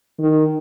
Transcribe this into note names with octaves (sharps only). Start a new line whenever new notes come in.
D#3